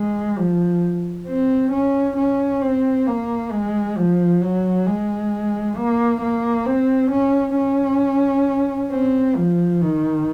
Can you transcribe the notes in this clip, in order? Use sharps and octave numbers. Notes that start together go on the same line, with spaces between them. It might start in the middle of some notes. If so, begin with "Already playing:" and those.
Already playing: G#3
F3
C4
C#4
C#4
C4
A#3
G#3
F3
F#3
G#3
A#3
A#3
C4
C#4
C#4
C4
F3
D#3